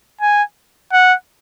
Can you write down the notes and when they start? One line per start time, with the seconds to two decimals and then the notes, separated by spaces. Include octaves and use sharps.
0.21 G#5
0.92 F#5